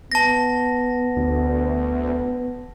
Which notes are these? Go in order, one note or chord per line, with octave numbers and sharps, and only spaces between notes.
B3 A5 A#6
D2